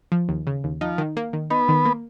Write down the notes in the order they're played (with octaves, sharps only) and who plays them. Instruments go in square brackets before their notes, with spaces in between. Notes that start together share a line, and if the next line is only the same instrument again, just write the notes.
[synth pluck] F3
D#2
C#3
D#2
[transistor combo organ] F3 [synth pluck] D#4
[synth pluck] D#3
A#3
D#3
[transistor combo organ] B3 [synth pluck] D#4
[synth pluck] D#3
A#3